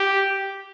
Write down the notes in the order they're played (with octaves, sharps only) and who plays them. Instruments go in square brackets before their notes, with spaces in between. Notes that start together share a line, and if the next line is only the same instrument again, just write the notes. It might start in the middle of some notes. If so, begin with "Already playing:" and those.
Already playing: [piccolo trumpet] G4